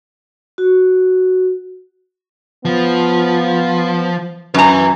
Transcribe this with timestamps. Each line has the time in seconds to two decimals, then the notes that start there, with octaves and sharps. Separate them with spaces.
0.58 F#4
2.65 F3 B3
4.54 F#2 B4 G#5 A#5